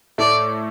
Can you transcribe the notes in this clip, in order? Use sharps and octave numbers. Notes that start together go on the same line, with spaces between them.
A2 A3 D5